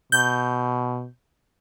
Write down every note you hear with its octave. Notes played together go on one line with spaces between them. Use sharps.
B2 G6